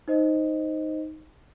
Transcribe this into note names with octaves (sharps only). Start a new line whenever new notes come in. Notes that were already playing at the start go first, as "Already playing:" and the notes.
D#4 C5 D#5